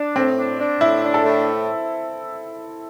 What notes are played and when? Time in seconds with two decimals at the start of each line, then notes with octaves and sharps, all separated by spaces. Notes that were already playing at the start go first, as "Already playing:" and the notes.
Already playing: D4
0.15 A2 C4
0.37 D4
0.59 D4
0.81 A2 E4
1.03 D4
1.14 A4
1.24 A2